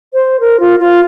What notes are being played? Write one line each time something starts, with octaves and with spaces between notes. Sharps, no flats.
C5
A#4
F4
F4